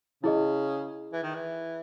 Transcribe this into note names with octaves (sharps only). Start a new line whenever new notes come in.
C#3 E4 G#4 D#5
E3
D#3
E3